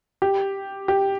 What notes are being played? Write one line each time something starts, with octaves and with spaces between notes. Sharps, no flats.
G4
G4